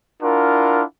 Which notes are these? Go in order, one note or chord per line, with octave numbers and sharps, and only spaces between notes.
D4 E4 F4 A#4 F#5